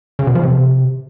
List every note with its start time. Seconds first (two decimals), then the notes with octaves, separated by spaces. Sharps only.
0.19 C#3
0.27 B2
0.35 F3
0.43 C3